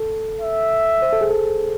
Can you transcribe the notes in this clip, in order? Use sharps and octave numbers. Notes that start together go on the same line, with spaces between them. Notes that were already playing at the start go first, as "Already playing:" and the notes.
Already playing: A4
E5
C5
A4
G#4
A4